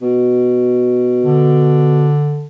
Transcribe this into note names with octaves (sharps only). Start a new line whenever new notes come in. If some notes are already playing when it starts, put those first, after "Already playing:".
B2
D3